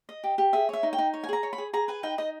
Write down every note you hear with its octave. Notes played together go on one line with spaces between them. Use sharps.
D#5
G4
G4
G#4 E5
C#5 E5
D#4
G5
D#4
C#5
G#5
G#4 A#5
C#5
B5
G#4
G#4 A#5
B4 G#5
D#4 G5
D#4 D#5